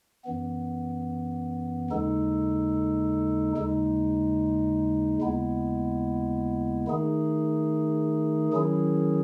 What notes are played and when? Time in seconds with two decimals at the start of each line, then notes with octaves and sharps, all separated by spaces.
0.25 F#2 E3 B3
1.90 D#2 C#3 G#3 D#4 A4
3.56 D#2 C#3 G#3 D#4
5.21 D#2 C#3 G#3 B3 E4
6.87 D#3 A3 D#4 G#4
8.53 D#3 F#3 C#4 E4 G#4